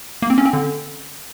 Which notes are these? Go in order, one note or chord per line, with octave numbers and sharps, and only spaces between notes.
A#3
C4
C#4
C4
D3